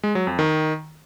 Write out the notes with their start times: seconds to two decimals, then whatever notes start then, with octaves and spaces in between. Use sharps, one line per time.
0.03 G#3
0.15 F#3
0.27 F2
0.39 D#3